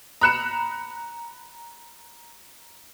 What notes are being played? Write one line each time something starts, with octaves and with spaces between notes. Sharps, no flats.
A#5 B5 F#6 C#7 E7